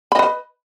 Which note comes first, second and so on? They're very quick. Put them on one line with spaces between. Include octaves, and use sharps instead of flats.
B5 D#5 B4